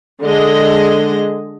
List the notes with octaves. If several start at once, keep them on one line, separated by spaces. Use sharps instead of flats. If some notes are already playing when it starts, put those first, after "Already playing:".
D3 G#3 D#5